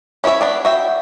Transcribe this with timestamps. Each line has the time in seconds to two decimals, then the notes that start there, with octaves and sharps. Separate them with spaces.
0.24 C#4 E4 A4 C#5 E5
0.41 B3 D4 D5
0.65 F#4 E5 G5